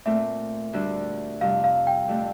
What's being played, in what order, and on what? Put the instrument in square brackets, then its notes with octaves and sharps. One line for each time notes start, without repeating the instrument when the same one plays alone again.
[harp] A#2 A3 C4 F4 [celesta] E5
[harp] D2 D3 G3
[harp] F2 C3 G3 [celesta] F5
[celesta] F5
G5
[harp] F2 D3 A3 C4 G4